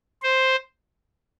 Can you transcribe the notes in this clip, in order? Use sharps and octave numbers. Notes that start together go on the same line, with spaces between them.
C5